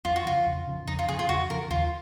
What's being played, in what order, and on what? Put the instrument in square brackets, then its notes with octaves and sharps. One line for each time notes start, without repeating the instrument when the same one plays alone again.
[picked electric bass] F2 [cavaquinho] F4
[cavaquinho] F#4
[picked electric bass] C#3 F3 [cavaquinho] F4
[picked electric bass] F2
C#3 F3
[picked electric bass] F2 [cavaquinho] D#4
[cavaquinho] F4
[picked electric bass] C#3 F3 [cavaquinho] G#4
[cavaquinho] F4
[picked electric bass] F2 [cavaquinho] F#4
[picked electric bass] C#3 F3 [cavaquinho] A#4
[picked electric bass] D#2 [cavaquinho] F4